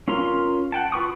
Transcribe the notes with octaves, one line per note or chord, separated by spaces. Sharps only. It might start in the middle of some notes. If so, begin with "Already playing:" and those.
C#4 F4 A#4 A#5 C6
F#5 G5 A5
F4 B4 C#6 D#6